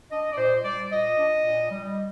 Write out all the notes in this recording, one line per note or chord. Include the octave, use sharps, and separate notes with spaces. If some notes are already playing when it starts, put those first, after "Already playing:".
D4 D#5
D5
A#2 C5
G3 D5
A#2 D#5
D4
A#2
G3